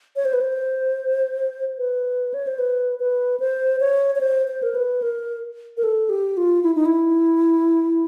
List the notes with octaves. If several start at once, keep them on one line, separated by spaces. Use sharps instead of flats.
C#5
C5
B4
C5
B4
C#5
C5
B4
B4
C5
C#5
C#5
C5
C5
A#4
B4
A#4
A#4
A4
G4
F4
E4
D#4
E4